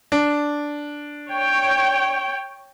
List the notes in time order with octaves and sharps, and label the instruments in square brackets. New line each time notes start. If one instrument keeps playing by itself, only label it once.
[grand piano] D4
[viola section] C#5 G5